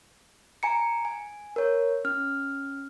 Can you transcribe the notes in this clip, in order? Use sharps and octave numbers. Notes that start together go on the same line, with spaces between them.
G#5 A#5 C#7
G#5
A#4 C#5
C#4 F6